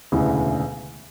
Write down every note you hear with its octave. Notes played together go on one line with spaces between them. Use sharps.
E1 D2 C#3 E3